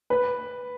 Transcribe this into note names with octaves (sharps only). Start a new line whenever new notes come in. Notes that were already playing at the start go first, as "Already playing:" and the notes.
B4